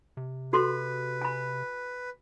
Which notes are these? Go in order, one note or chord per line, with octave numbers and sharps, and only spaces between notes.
C3
F#4 A4 B4 C6
G#5 B5